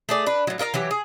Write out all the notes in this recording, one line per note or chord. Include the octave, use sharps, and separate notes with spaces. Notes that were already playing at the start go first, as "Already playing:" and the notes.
A3 G#4 D5
D4 B4
A2 F#3
F4 A#4 D#5 F5
E3 F#3 G4
G#4